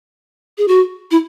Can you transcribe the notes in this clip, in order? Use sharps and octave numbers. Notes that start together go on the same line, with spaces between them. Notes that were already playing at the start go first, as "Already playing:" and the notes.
G#4
F#4
E4